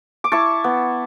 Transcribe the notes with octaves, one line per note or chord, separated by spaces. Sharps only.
D6
E4 A5 C#6
B3